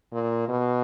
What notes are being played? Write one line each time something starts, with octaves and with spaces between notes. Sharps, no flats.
A#2
B2